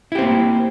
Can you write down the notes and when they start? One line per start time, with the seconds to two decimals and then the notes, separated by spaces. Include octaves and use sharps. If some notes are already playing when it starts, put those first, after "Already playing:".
0.12 E4
0.15 G4
0.19 C4
0.22 A#3